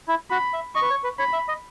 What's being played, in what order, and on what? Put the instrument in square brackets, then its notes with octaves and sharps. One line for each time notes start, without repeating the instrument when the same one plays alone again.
[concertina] E4
[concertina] F#4 [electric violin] B5
[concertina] E5
[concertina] D#5 [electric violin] C#6
[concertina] B4
C#5
B4
[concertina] C#5 [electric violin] B5
[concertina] E5
D#5